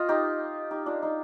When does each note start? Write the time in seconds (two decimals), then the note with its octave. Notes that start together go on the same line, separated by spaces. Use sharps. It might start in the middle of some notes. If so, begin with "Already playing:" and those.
Already playing: F4 D#5
0.09 D#4 G4
0.71 D#4 G4
0.86 D4 F4
1.03 D#4